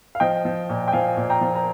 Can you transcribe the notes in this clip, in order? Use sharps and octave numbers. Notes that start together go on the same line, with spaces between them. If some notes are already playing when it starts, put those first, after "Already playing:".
F5
F3 D#5 G5
F3
A#2
G5
F3 F5 G#5
A#2
G5 A#5
F3
A#5